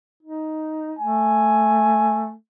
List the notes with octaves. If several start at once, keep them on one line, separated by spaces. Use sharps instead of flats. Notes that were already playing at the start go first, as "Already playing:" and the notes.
D#4
A3 G#5